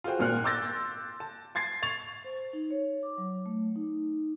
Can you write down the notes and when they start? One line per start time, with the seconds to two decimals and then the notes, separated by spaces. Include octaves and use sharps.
0.04 F4 F#4 G#4 C5 G5
0.19 G#1 A#2 F6 F#6
0.44 C6 D6 E6 G6 A6 A#6
1.20 A5
1.55 C6 G#6 A6 C7
1.82 C#6 A6 F7
2.24 C5
2.53 D#4
2.71 C#5
3.03 D6
3.18 F#3
3.46 A3
3.76 D#4